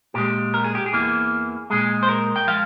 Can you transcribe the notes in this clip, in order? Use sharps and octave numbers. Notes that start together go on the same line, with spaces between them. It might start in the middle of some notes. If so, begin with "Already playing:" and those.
A#2 G#3 G4
A#4
G#4
G4
G#4
E2 E3 A#3
A#2 G#3 G#4
C5
A#4
G5
F3 G#3 F5